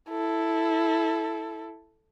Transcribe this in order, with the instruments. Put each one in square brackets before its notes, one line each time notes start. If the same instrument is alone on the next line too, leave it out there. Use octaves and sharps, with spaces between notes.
[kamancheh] E4 A4